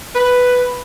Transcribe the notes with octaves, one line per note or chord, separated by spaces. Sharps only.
B4